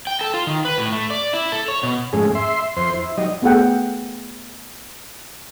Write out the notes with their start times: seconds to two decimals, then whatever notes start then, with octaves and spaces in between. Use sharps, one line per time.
0.07 G5
0.21 A4
0.34 F4
0.47 D#3
0.65 B4
0.78 A2
0.93 A3
1.10 D5
1.33 E4
1.52 A4
1.68 C#5
1.83 B2
2.13 F2 G#2 G#3 A3 C#4 G#4
2.35 E5 C6
2.77 F2 C5 C6
2.94 E4
3.17 F#3 G3 D#4 D#5
3.42 A3 B3 G#4 A4 F#5 G5